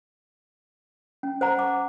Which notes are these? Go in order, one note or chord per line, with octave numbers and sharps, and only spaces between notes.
C#4
C5 F#5 A#5
D6